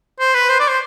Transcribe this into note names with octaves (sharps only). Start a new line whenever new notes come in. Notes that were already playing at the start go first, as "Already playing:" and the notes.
C5
B4
C5
D5
C5